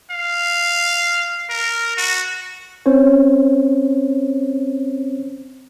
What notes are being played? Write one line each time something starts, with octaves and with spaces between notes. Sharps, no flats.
F5
A#4
F#4
C4 C#4 C5 C#5